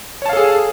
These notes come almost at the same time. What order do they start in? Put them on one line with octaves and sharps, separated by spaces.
C#5 A5 F5 A4 G#4